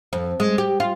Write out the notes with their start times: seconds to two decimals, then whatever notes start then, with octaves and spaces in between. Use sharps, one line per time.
0.13 F2
0.40 G#3
0.58 G4
0.80 F4